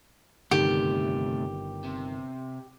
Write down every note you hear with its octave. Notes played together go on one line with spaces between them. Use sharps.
G1 C3 D#3 A3 G4
C3